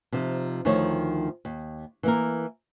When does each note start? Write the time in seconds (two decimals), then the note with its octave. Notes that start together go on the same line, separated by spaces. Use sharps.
0.13 C3 F3 D#4
0.65 D2 D#3 F3 A3 D#4 C#5
1.45 D#2
2.03 E3 A#3 A#4